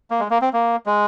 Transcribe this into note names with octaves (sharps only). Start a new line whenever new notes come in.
A#3
G#3
A#3
C4
A#3
G#3